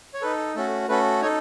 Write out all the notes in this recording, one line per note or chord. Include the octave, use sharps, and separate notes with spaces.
C#5
D#4 A4 B4
A3 C#4 F#4 A4
A3 C#4 F#4 A4 B4
D#4 A4 C#5